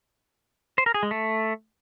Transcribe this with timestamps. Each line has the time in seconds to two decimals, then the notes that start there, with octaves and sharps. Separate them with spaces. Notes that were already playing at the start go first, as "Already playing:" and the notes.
0.78 C5
0.86 A#4
0.94 G#4
1.03 G#3
1.11 A3